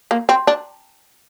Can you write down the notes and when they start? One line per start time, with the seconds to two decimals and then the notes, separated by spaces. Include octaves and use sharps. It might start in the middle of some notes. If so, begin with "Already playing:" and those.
0.11 A#3
0.29 C4
0.47 D4